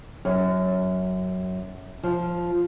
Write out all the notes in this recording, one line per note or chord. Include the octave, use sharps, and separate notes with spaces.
F#2
F3